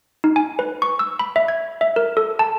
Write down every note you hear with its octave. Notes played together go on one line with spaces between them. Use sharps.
D#4
G#5
B4
C#6
E6
B5
E5
G#6
E5
A#4
A4
A5